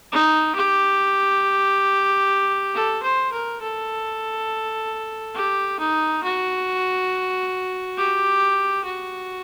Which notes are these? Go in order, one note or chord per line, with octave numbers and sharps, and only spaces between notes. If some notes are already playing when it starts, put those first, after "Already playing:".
D#4
G4
A4
C5
A#4
A4
G4
D#4
F#4
G4
F#4